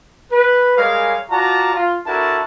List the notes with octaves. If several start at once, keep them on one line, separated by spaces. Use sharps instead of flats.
B4
G3 G#3 G#4 A#4 C#5 F5
F4 F#4 D5 A5 A#5
F4
D4 E4 F#4 A4 A#4 A5